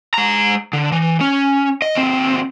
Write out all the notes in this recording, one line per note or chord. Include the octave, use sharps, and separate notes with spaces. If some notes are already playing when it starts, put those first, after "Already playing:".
G#3 A#5
D3
E3
C#4
D#5
D#2 C4